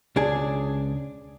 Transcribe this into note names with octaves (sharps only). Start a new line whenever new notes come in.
C#2 D4 G#4